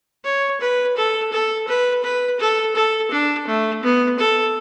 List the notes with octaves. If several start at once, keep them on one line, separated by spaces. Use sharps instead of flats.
C#5
B4
A4
A4
B4
B4
A4
A4
D4
A3
B3
A4